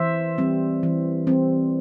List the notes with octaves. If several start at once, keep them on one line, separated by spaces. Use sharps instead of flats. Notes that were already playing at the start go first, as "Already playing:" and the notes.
Already playing: E3 C5 E5
G3 C4
E3
G3 C4